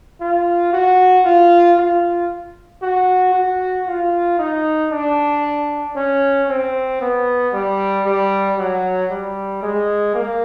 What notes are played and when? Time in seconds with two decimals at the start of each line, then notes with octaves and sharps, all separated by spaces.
0.21 F4
0.73 F#4
1.25 F4
1.78 F4
2.83 F#4
3.34 F#4
3.87 F4
4.39 D#4
4.92 D4
5.96 C#4
6.49 C4
7.01 B3
7.53 G3
8.06 G3
8.58 F#3
9.11 G3
9.63 G#3
10.15 A#3